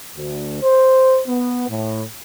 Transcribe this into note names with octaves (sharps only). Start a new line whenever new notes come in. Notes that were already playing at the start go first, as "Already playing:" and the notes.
D2
C5
B3
A2